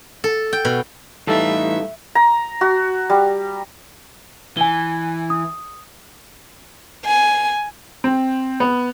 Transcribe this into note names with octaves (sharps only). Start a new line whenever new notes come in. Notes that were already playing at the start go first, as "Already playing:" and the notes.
A4
G5
B2
E3 G3 A3 D#4 A4 E5 F5
A#5
F#4
G3
E3 G#5 G7
D#6
G#5
C4
B3